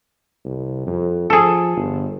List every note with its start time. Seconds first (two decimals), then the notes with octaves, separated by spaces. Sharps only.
0.45 C2
0.87 F2
1.30 F3 G#4 A4
1.77 G1